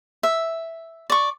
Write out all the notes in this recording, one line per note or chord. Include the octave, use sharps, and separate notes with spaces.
E5
D5 C#6